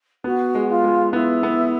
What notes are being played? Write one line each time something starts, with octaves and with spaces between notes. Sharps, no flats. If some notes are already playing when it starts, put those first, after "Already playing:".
B3 F#4
G#3
F4
G#3
B3 E4
B3